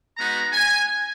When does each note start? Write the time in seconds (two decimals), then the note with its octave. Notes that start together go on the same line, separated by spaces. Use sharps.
0.18 G#3 B3 D#4 F#4 A#5
0.53 G#5